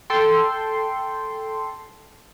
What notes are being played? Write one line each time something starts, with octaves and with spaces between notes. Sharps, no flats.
A4 G5 C6